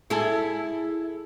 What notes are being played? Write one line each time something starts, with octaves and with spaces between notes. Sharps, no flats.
E4 G#4 A4